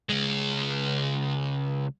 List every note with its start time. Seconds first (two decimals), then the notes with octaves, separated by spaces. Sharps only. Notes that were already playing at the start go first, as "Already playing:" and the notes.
0.09 C#2 G#3